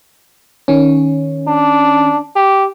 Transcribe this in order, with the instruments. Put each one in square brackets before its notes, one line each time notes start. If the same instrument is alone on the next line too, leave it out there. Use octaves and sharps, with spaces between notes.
[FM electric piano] D#3 C#4
[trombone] D4
G4